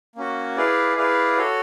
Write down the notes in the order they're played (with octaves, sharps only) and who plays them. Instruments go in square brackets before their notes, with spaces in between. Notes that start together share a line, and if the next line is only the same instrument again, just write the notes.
[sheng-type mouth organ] A#3 C#4 F#4
E4 G#4 B4 D5 F5
E4 G#4 B4 D5 F5
F#4 A4 C#5